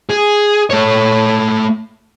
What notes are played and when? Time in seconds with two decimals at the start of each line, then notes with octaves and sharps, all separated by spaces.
0.09 G#4
0.70 A3 C#5